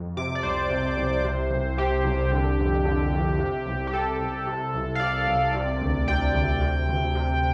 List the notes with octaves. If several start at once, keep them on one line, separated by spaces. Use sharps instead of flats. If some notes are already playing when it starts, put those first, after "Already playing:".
Already playing: F2
C3 D6
D5
C2 C5
C3
C2
C3
C2
C3 G4
C2
D3
F2
D3
F2
C3
C2
G4
C3 A4
C2
C3
C2
F5
C3 D5
C2
C3
D2
C3 G5
D2
C3
D2
C3